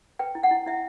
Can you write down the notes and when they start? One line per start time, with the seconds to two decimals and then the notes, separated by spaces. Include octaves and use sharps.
0.19 B4 G5
0.35 E4
0.43 F#5
0.51 E4
0.66 E4 E5